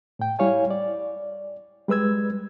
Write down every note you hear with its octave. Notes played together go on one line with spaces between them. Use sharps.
A2 G5
G3 E4 C#5 F5 G#5
D5
G3 G#3 B4 E6 G#6